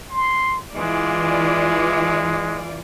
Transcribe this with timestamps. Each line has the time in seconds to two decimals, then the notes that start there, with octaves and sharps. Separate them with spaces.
0.10 C6
0.75 E3 G#3 F4 D5